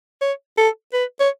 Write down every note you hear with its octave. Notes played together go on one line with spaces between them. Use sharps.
C#5
A4
B4
C#5